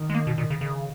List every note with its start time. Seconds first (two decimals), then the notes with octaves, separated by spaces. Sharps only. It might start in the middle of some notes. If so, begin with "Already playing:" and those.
Already playing: D#3
0.10 G#3
0.15 A#3
0.27 B2
0.38 A#2
0.50 C#3
0.61 C#3